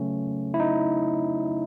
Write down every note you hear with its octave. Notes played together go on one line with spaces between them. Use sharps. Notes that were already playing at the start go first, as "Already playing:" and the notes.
Already playing: C#3 F#3 A3 C#4
E4
D#4